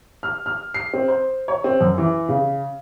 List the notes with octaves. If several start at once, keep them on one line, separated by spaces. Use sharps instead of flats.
F6
F6
C7
C4
C5
C#5
C4
F#2
E3
C#3